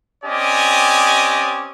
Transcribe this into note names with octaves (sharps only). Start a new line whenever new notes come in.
C4 C#4 G4 D5 D#5 G#5